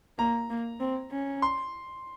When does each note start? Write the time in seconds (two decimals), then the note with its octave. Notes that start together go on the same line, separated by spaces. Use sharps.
0.18 A#3 A#5
0.50 A#3
0.80 C4
1.11 C#4
1.42 C6